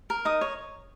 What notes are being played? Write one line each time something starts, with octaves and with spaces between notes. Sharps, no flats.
A#4
D#4 D#6
C#5